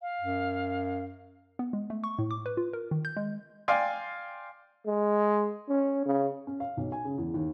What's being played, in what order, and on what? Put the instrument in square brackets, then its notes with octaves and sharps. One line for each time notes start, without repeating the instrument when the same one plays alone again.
[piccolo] F5
[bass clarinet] F#2
[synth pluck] B3
G#3
A3
C#6
A2
D6
B4
F4
A#4
D#3
G6
G#3
[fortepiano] D5 F5 G5 G#5 C6
[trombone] G#3
C#4
C#3
[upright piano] C#4
F5
B1
G#5
C#3
E2
D#2